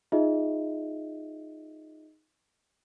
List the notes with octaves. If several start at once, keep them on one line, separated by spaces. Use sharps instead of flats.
D#4 F4 G#4 D#5 E5